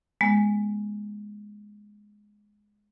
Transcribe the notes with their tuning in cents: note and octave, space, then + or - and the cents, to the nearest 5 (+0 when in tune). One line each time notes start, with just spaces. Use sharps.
G#3 +0 B3 -30